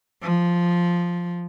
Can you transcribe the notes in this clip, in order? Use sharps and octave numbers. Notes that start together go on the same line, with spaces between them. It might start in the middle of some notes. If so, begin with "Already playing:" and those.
F3